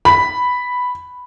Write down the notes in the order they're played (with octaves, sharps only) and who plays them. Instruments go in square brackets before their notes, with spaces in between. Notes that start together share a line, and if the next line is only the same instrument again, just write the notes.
[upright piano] B5